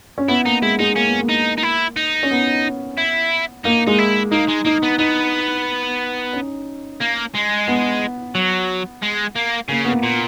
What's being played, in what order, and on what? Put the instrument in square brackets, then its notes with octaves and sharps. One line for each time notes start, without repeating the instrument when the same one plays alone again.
[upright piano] C#4
[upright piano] B3 [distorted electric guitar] E4
[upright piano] A#3 [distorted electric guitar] D#4
[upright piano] G#3 [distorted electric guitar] E4
[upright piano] G#3 [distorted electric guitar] D#4
[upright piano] A#3 [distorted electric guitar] C#4
[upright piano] B3
A#3
[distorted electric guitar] D#4
D#4
E4
D#4
[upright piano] C#4
B3
[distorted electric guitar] E4
[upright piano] A#3 [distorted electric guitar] D#4
[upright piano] G#3 [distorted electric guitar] D#4
[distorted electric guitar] E4
[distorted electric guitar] A#3 [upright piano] D#4
[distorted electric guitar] G#3
[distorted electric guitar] A#3 [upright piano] D#4
[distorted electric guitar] B3
[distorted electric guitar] B3 [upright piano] D#4
[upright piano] C#4
[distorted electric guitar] A#3
G#3
[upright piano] B3
[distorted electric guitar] F#3
G#3
A#3
[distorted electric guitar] C#3 [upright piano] A#3
[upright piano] B3
A#3
[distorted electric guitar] A#2